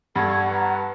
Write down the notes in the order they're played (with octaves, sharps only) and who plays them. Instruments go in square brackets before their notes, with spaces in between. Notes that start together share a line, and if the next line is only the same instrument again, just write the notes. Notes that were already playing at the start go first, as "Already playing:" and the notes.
[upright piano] G2 [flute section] A4 C#6 G#6 [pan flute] F#5
[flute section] B4 A5 A#5